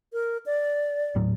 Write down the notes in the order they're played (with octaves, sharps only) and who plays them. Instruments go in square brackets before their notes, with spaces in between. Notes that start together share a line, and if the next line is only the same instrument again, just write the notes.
[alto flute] A#4
D5
[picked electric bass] D#1 A2 F#3